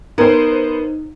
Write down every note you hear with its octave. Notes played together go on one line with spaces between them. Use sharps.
B3 D#4 A#4 C5